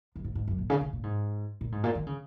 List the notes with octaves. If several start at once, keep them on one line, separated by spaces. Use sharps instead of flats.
F#2
G#2
G#2
F#2
A#2
C#3
C#3
A#2
G#2
A#2
G#2
A#2
D#3
C#3